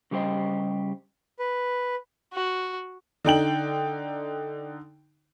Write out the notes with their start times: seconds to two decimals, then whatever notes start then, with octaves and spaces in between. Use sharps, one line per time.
0.11 C#3 G3 A3 G4 C5 D#5
1.39 B4
2.33 F#4
3.24 D3 D#4 G5 F#7